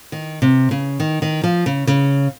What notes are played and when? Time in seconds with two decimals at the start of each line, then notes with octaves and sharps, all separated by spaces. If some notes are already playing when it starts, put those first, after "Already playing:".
0.12 D#3
0.42 C3
0.71 C#3
1.00 D#3
1.22 D#3
1.44 F3
1.66 C#3
1.87 C#3